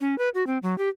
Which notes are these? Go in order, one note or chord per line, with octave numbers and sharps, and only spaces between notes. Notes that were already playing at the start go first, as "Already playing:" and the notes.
C#4
B4
F#4
C4
F#3
G4